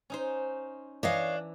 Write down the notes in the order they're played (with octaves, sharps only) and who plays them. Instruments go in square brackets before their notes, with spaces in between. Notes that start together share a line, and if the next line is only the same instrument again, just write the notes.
[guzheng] C#4 D#4 C5
[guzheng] E3 [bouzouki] D4 [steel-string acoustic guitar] C#5 D#5 F5